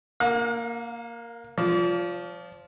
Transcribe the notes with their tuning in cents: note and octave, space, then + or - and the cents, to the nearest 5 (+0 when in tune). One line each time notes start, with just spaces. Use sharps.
A#3 +0 F5 +45
F3 +0 D5 -40